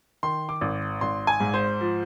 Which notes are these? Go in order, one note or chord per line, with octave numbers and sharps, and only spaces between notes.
D#3 C6
D6
G#1
G#1 C6
G#5
G#2
C5
F3